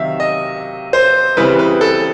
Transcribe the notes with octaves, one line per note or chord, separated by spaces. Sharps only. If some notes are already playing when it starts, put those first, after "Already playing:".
Already playing: C3 D#3 F#3 E5 F5
D#5
C5
C#3 E3 G3 C4 E4 B4
B4
A4